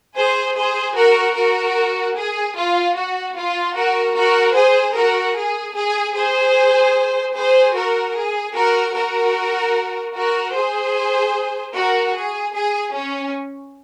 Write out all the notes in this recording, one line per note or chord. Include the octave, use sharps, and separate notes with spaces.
G#4 C5
G#4 C5
F#4 A#4
F#4 A#4
G#4
F4
F#4
F4
F#4 A#4
F#4 A#4
G#4 C5
F#4 A#4
G#4
G#4
G#4 C5
G#4 C5
F#4 A#4
G#4
F#4 A#4
F#4 A#4
F#4 A#4
G#4 C5
F#4 A#4
G#4
G#4
C#4